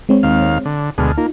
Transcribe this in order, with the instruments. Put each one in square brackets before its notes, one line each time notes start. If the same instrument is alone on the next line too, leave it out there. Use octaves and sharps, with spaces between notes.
[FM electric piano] G#3 C4 C#5
[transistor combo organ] D#2 F5
D3
[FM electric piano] D2 A5 F6 [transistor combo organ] B2 D3 G#3
[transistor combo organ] A#3 [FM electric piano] D#4 F4